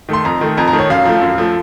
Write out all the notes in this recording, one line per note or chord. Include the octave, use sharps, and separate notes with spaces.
D#3 A3 C6
F2 A#5
D#3 A3
F2 A#5
A#5
D#3 A3
C#5
F#2 F5
F3 A3
F#2
F3 A3